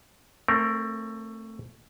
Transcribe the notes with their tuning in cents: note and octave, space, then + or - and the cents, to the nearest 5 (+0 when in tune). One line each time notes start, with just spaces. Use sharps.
A3 +15 C4 +25 A#4 +0